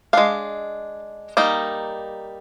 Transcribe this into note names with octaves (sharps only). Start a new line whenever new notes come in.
G#3 D4 F5
G3 A#3 D#4